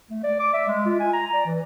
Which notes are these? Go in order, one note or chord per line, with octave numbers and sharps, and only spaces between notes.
A3
D5
D6
E5
G#3
F4
G#5
A#5
D5
E3